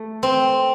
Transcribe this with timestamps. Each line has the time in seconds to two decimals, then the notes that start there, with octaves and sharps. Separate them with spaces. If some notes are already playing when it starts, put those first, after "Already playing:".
Already playing: A3
0.23 C4